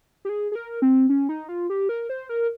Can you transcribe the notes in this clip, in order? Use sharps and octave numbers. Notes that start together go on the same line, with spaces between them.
G4
G#4
G#4
A#4
C4
C#4
D#4
F4
G4
A#4
C5
A#4